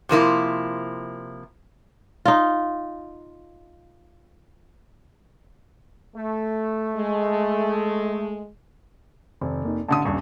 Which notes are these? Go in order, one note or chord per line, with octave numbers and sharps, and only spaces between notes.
C3 F3 A#3 E4
D#4 F4
A3
G#3
F1 C3 D#3 C4
A#3 D#4
A1 D3 A5 D#6
D#1 G2 C#6